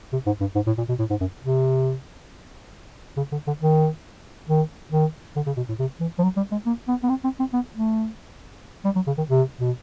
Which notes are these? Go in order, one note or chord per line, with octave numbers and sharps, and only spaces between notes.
C3
G#2
G2
G#2
A2
A#2
B2
A2
G#2
F#2
C3
C#3
D3
D3
D#3
D#3
D#3
D3
C#3
B2
A2
C3
E3
F3
F#3
G3
G#3
A#3
B3
B3
C4
C4
C4
B3
A3
G3
F#3
C#3
D#3
C3
B2